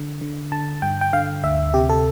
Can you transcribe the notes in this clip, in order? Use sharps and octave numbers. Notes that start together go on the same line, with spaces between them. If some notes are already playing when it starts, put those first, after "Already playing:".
Already playing: D3
D3
D3 A5
G2 G5
G5
D3 F5
D2 E5
C3 G4
A4